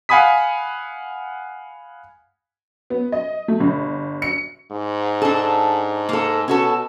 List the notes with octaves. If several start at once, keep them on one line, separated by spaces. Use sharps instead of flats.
F5 F#5 G#5 B5 D#6 B6
B3
D#5
A3
G1
C#7
G#2
D4 A4
A#3 A4
B2 C#4 F#4 A4